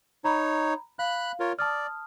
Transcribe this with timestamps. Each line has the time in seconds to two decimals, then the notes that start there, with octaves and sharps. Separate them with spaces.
0.24 D#4 C#5 A#5 B5
0.99 F5 B5 F#6
1.40 F4 A#4 C#5
1.59 D5 A5 D#6 F6